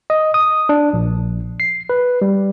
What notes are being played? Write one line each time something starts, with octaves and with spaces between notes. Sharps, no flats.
D#5
D#6
D4
A#1
C7
B4
G3